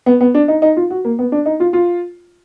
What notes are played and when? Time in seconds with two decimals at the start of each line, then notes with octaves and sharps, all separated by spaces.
0.06 B3
0.21 B3
0.35 D4
0.48 D#4
0.62 D#4
0.77 F4
0.90 F#4
1.05 A#3
1.19 B3
1.32 D4
1.46 D#4
1.60 F4
1.73 F4